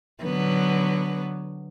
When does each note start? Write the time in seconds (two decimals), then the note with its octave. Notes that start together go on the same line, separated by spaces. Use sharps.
0.23 D3 F#3 B3